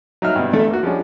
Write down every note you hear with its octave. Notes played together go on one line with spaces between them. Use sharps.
F#3 D#4 E5 F6
G2 B2
A1 A3 A4
A#3 F#4
F3 G3 G#3 C#4 D4